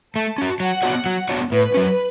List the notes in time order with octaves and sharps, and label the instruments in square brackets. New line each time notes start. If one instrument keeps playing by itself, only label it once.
[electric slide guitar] A3 [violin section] A5
[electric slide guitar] C#4 F#4
[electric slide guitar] F#3 [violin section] F#5
[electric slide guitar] B3 D4 F#4 C#5
F#3
B3 D4 F#4 C#5
[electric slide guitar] A2 [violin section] B4
[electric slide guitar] F#3 C#4